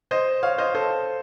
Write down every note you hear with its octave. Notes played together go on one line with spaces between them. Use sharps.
C5 D#5
C#5 F5
C5 D#5
A4 C5